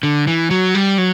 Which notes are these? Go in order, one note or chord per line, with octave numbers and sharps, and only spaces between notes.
D3
E3
F#3
G3
F#3